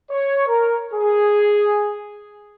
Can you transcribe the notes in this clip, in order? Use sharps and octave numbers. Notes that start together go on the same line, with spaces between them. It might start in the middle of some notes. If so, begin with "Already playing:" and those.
C#5
A#4
G#4